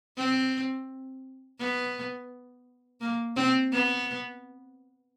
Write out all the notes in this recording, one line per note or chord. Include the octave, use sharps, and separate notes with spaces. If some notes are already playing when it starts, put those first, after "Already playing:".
C4
B3
A#3
C4
B3